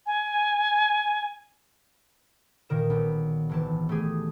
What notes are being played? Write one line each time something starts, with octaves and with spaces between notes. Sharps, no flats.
G#5
A#2 D#3 A#4 E7
B1
G#1 E3 A5
A3 G4 G#4